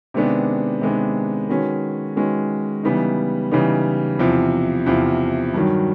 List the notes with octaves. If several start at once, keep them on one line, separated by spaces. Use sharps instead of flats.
C3 D#3 G#3 B3 D4
C3 D#3 G#3 B3 D4
D#3 G#3 C#4 F#4 B4
D#3 G#3 C#4 F#4 B4
C#3 E3 G3 B3 D#4
C#3 E3 G3 B3 D#4
E2 C3 F3
E2 C3 F3
G2 D#3 F#3